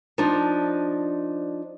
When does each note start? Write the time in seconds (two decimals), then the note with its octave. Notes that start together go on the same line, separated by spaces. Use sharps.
0.18 F3 D4 D#4